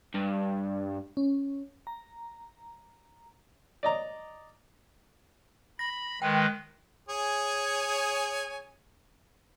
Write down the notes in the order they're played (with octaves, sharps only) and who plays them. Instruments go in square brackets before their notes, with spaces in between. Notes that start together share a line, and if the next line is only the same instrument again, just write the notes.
[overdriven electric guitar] G2
[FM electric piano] C#4
A#5
[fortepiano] D5 D#5 A#5
[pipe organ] B5 [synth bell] A#6
[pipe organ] D#3 G#3 B4 [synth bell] G5
[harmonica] G#4 C#5 G#5